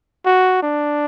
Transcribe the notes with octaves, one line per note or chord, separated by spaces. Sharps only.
F#4
D4